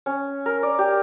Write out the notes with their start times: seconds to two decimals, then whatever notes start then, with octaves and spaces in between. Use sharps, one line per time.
0.06 C#4
0.46 A#4
0.63 D5
0.79 G4